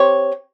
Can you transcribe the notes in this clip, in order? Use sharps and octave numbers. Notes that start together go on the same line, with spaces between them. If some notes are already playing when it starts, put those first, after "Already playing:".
Already playing: C4 G4 C#5